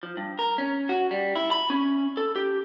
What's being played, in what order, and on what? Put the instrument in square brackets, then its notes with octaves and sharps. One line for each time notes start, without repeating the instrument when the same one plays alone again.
[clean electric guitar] F3
G2
A#4
C#4
F#4
G3
E4
B5
C#4
A4
G4